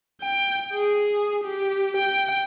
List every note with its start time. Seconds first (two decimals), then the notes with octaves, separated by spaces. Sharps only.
0.21 G5
0.73 G#4
1.44 G4
1.97 G5